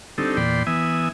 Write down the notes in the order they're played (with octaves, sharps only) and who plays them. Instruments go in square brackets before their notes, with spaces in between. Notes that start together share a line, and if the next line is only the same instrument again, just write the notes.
[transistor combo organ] D3 G3 C4 D#4 A4
E2 A#2 D5 G5 B5 C6
E3 B3 E5 G#5 D#6